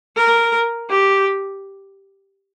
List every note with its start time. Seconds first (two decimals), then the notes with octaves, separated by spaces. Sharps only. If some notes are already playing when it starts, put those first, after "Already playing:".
0.16 A#4
0.90 G4